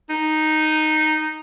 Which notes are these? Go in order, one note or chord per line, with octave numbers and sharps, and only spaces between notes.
D#4